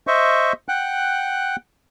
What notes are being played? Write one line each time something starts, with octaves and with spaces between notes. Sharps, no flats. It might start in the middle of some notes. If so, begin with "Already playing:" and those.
C5 D#5 E5 C#6
F#5 G5 F#6